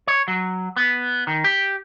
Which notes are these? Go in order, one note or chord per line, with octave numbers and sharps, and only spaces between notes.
C#5
F#3
B3
D#3
G4